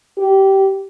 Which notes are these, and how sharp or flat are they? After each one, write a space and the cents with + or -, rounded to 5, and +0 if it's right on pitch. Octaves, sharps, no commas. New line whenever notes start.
G4 -20